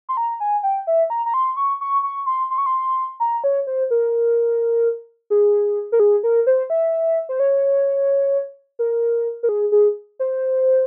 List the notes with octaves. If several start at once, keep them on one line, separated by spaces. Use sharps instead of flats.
C6
A#5
G#5
G5
E5
A#5
A#5
C6
C#6
C#6
C#6
C6
C6
C#6
C6
A#5
C#5
C5
A#4
G#4
A#4
G#4
A#4
C5
E5
C5
C#5
A#4
A#4
G#4
G#4
C5